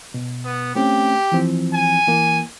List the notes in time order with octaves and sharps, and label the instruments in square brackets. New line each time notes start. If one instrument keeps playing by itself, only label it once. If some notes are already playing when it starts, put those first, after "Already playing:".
[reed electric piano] B2
[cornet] B3
[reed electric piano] A3 C4 C#4 [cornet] G4
[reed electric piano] E3 F3 C4
[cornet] G#5
[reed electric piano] E3 A#3